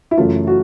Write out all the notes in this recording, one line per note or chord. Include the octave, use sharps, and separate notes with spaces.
E4
F#2 C#3 E3 A3 F4
F#4